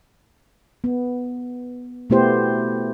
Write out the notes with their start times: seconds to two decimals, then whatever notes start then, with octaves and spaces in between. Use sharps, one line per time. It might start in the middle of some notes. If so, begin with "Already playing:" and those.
0.84 B3
2.10 B2 A3 B3 E4 G4 C5